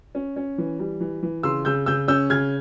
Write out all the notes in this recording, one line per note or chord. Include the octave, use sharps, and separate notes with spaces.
C#4
C#4
E3
G3
E3
E3
C#3 C6 E6
C#3 E6 G6
C#3 E6 G6
C#4 E6 G6
C#3 F6 G#6